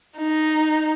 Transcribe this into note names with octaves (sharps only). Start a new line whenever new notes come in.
D#4